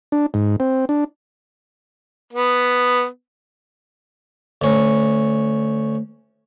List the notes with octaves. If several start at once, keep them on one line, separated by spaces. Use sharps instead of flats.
D4
G#2
C4
D4
B3
D2 C#4